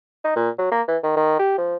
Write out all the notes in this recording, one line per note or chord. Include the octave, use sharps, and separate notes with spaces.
D#4
A#2
F#3
A#3
E3
D#3
D#3
G4
F3